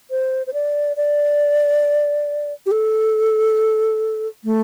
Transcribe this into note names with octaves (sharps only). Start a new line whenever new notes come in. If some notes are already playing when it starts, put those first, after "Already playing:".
C5
C5
D5
D5
G4
A4
A3